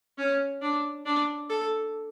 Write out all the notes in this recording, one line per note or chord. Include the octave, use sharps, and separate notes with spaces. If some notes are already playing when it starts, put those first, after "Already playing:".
C#4
D4
D4
A4